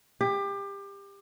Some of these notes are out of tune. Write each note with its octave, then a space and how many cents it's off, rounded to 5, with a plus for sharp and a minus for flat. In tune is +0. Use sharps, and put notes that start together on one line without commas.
G4 +25